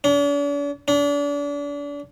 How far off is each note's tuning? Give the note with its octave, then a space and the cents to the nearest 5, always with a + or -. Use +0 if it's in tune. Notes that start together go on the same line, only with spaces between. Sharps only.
D4 -45
D4 -35